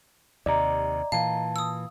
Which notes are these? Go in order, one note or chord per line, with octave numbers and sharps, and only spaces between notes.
D#2 C3 D5 D#5 A#5
A#2 E3 F5 A5
D#6 E6